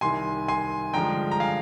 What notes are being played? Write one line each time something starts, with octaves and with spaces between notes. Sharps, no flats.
C2 C3 D#3 G#5 C6
G#5 C6
G2 D3 F3 G#3 G5 A#5
A#5
F5 G#5